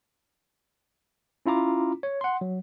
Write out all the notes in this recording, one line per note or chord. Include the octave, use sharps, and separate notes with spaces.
C#4 E4 F4 A#5 D6
C#5
F#5 C6
F#3